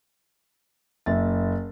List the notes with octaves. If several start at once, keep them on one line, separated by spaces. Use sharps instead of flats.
F#1 E5 A6